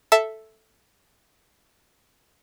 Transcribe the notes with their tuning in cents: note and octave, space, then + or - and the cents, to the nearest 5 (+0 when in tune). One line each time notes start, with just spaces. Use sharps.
A4 +0 E5 +0 A5 +0